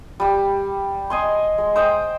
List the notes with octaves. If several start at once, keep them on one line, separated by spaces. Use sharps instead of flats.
G3 G4
D#5 G#5 C6
G#3
C5 D#5 G5